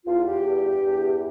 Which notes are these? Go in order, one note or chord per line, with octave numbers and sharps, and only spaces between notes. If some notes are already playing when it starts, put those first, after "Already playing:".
E2 F4
E2 G4
G2
G2
E2
E3